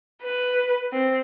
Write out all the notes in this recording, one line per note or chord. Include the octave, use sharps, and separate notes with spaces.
B4
C4